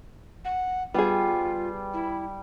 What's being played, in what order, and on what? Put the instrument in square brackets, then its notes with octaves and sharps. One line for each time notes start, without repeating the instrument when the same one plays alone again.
[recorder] F#5
[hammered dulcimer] G3 [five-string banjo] B3 G#4 [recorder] F4
[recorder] E4